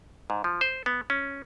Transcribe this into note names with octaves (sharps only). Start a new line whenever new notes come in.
G#2
F3
C5
B3
C#4